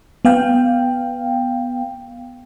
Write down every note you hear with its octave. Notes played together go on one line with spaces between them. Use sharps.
B3 F5 G5